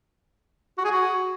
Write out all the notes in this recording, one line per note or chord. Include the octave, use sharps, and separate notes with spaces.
F#4
G#4
F#4